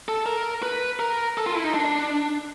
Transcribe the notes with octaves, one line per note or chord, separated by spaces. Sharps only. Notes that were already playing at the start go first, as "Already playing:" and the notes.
A4
A#4
B4
A#4
A4
F4
E4
D#4
D4